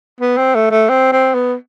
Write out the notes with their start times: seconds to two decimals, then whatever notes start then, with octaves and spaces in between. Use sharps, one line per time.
0.20 B3
0.37 C4
0.55 A3
0.71 A3
0.89 C4
1.12 C4
1.34 B3